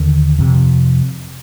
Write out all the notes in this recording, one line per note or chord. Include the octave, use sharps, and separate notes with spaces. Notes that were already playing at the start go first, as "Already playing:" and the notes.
Already playing: D#2 D3
F2 C3